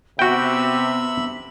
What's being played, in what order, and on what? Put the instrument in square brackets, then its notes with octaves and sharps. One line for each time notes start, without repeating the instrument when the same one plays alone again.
[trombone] C3 [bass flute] B3 [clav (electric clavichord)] F#4 G5 [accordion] E5 B5